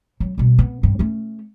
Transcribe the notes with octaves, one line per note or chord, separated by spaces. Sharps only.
F#3
B2 G3
B3
G2
A3 C#4